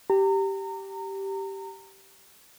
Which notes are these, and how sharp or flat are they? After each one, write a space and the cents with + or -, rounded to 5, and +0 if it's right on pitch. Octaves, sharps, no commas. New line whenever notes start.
G4 -10 A#5 -30